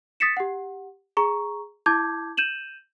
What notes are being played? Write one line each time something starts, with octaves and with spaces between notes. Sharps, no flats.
D#6 A6 B6 C#7 E7
G4 F#5
G#4 A#5 C#6
E4 A5 D6 G6 G#6
G6 D#7 E7 F#7